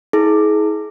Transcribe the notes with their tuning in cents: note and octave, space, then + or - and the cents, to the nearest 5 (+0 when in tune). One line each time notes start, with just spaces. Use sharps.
E4 -40 G#4 +30